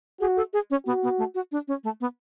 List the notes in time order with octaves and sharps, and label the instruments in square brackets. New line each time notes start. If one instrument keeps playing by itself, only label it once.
[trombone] F#4 [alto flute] G#4
[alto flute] A4
G#4
C#4
[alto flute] B3 [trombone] F#4
[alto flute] B3
A3
F#4
D4
C#4
A3
B3